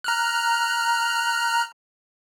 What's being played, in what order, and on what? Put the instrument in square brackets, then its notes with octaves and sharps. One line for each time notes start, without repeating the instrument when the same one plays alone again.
[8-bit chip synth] A#5 F6 F#6